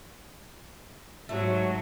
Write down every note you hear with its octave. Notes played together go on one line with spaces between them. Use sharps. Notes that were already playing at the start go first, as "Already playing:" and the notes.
G#2 F#3 A3